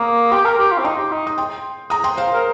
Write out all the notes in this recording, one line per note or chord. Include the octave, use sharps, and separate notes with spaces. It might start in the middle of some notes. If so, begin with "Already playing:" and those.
Already playing: A#3 A#5 D#6
G4 G5 C6
A#4
G4
F4
C4
D#4 G5 C6
G4
D#4
D#6
G5 C6
A#5 D#6
G5 C6
C5 F5
A#4